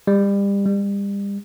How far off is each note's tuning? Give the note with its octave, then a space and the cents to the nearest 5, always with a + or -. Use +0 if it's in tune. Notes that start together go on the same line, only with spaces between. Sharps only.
G3 +30
G3 +35